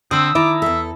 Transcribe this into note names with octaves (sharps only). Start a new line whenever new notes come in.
D3 C4 B5 D#6 E6
D#3 E4 A5 A#5 D6
E2 A4 E5